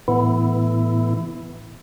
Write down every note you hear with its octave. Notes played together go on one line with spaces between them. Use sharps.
A2 E3 B3 E4